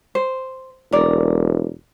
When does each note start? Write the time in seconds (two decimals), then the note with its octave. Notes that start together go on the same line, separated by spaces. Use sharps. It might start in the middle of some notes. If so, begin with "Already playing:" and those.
0.15 C5
0.92 E1 A#4 D5